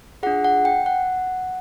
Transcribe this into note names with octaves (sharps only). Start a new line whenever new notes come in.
D4 F4 G#4 F#5
F#5
G5
F#5